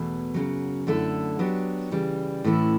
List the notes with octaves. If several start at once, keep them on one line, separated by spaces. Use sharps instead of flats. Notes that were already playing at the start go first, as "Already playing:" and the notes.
Already playing: E2 B2 A3
F#2 C#3 F#3
F#2 D3 A3 E4 A4
F#3 B3 D4 G4 C#5
C#3 E3 G3
A2 E3 A3 C#4 E4